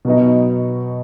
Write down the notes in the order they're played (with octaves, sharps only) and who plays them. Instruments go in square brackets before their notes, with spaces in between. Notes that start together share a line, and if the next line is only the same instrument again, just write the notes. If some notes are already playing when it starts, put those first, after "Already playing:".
[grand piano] B2 F#3 B3 D#4